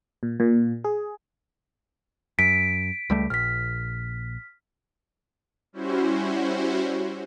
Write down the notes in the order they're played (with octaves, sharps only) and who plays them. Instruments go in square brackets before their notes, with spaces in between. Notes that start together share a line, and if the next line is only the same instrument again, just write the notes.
[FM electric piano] A#2
A#2
G#4
[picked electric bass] F#2 [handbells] B6 D7
[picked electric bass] C#2 G3 A3
[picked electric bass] A#1 [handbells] F6 B6
[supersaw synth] G3 C#4 E4 F#4 C5